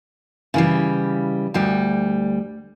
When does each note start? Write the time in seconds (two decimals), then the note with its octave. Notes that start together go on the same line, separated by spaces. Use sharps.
0.54 C#3 E3 G3
1.54 D2 G3